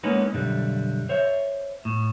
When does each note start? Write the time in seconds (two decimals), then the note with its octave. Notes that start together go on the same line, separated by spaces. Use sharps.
0.03 G#3 A#3 B3 C#4 D#4 B4
0.33 B1 F#2 D3 G3
1.09 C5 C#5 E5
1.85 A2